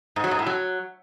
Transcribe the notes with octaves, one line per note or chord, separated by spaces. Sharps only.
G#2
F#3
G#2
A2
F#3